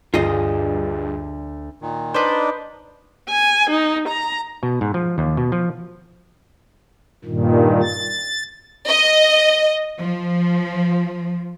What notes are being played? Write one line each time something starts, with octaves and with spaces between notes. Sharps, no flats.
D2 G2 F4 G#4 D#5
A#2 D#3
D4 D#4 B4 C5 D5
G#5
D#4
A#5
B2
G#2
F3
D#2
B2
F3
G2 A#2 D#3
A6
D#5
F3